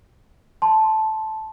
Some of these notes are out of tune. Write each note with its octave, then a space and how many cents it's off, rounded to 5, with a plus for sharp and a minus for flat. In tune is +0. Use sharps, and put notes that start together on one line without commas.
A5 -10 C6 +0